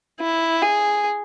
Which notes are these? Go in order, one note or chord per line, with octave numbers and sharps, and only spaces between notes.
E4
G#4